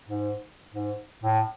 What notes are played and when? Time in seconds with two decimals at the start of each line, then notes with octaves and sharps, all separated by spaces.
0.08 G#2
0.74 G#2
1.23 A2